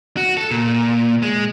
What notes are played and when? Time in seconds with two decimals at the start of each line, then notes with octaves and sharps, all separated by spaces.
0.17 F#4
0.37 A4
0.51 A#2
1.23 G#3